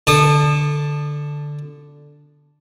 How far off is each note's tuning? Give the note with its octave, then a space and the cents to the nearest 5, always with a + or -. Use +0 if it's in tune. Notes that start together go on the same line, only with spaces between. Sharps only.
D3 +0 A5 +0 D#6 -35